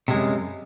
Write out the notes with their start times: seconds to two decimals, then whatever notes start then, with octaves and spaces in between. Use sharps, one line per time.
0.08 C3
0.11 G#3
0.13 F#2
0.16 G3